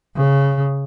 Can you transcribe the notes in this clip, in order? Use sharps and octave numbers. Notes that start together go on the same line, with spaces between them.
C#3